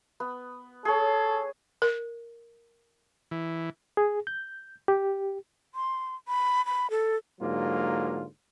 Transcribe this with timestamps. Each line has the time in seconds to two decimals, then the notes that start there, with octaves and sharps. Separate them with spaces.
0.20 B3
0.85 G#4 A4 C#5
1.82 A#4
3.31 E3
3.97 G#4
4.27 G6
4.88 G4
5.75 C6
6.28 B5
6.66 B5
6.90 A4
7.40 G#2 D3 F#3 A#3 F4